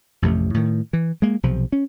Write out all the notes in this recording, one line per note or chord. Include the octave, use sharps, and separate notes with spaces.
A1 F2 C3 A3
A2 D#3
E3
G#3 A#3
B1 C3 F3
C#4